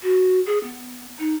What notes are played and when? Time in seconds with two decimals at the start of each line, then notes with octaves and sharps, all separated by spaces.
0.02 F#4
0.46 G#4
0.63 B3
1.18 D#4